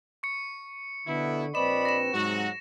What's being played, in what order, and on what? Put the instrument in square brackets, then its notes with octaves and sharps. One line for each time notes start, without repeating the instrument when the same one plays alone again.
[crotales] C#6 C#7
[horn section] B2 B3 E4 [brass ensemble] D3
[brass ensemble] A#1 C4 B4 [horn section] D5 D#5 B5 [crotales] E7
[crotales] A#6 E7
[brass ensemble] G#2 [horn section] C3 F#3 F#4